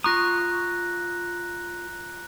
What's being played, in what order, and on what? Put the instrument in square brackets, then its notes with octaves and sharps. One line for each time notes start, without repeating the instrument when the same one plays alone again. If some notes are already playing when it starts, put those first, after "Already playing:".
[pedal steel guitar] F4 C#6 D#6 [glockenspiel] A#5 F#6 A#6